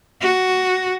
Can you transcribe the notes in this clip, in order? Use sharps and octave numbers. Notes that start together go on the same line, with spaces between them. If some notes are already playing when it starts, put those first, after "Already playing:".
F#4